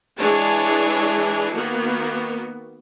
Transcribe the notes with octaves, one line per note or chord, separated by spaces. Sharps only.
E3 G#3 D4 G#4 C#5 A5
D#3 A#3 B3 F#4